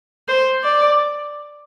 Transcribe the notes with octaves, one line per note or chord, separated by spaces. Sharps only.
C5
D5